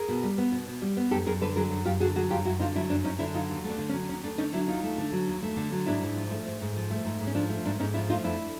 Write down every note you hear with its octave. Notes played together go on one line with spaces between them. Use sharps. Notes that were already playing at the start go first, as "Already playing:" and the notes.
Already playing: G#4 A#4
B2
G3
B3
B2
B2
G3
B3
F#2 G4 A4
F#2 G#4 A#4
D3 A4 B4
F#3 G#4 A#4
F#2
F#2 F4 G4
D3 F#4 G#4
F#3 F#4 G#4
F#2 F4 G4
F#2 E4 F#4
D3 D#4 F4
F#3 D4 E4
F#2 D4
F#2 C#4 D#4
D3 D4 E4
F#3 D#4 F4
D#2
A3
D4
D3
C#4
F#3
D#2 C#4
A3 D4
D3 C#4 D#4
F#3 D4 E4
D#2 D#4 F4
A3
D3
F#3
D#2
A3
D3
F#3
G#2 D4 E4
G#2
F3
A3
G#2
G#2
F3
A3
G#2
G#2
C#4
F3 D4
A3
G#2 D4
G#2 C#4 D#4
F3 D4 E4
A3 D#4 F4
F2 D4 E4